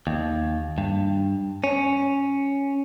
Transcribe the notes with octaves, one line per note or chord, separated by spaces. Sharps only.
D#2
G2
C#4